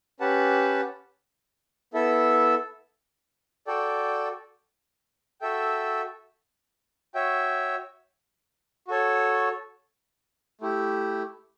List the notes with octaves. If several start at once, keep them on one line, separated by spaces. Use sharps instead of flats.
C#4 G4 B4 F#5 A5
B3 E4 A4 E5
F#4 A4 D5 G5
F#4 A4 E5 G5
F#4 C#5 E5 G5
F#4 A4 C#5
A3 E4 G4